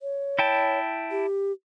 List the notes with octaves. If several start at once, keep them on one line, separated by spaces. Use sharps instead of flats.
C#5
E4 G5 A5
G4